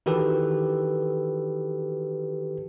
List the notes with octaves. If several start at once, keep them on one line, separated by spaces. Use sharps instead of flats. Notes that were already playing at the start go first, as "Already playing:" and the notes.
D#3 E3 F#4 G4 A4 B4